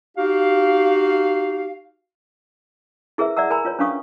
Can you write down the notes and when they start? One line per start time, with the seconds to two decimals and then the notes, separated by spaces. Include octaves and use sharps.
0.17 D#4 F#4 G4 F5
3.18 E4 G#4 A#4 B4 E5
3.37 D5 E5 F#5 A#5 E6
3.50 A#4 G#5 A#5 B5
3.65 F4 B4 C#5
3.79 C#4 D4 B4 F5 C#6 D#6